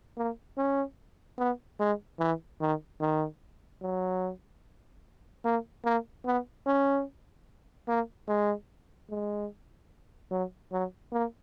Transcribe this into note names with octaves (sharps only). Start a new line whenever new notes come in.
A#3
C#4
B3
G#3
E3
D#3
D#3
F#3
A#3
A#3
B3
C#4
A#3
G#3
G#3
F#3
F#3
A#3